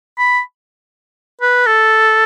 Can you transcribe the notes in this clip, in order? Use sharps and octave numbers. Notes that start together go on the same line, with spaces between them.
B5
B4
A4